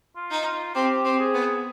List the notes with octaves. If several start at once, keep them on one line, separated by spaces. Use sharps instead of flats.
F4
D#4
F4
C4 G4
C4
G#4
B3